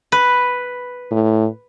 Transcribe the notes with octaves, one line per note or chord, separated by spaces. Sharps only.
B4
A2